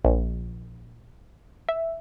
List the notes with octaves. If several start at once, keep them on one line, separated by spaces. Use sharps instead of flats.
A#1
E5